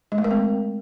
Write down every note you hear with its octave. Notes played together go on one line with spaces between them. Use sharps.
G#3
A3
A#4
C4